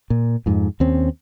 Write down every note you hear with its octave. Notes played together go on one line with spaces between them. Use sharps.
A#2
F2 G#2
D#2 C4 C#4